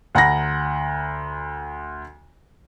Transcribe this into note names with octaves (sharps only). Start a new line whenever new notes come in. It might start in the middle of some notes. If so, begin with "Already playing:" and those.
D2 F#5 A#5 B5 A#6